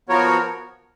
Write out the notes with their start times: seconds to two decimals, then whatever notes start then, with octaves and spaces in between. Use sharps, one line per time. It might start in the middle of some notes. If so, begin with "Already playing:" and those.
0.09 F3 B3 F#4 A#4 C#5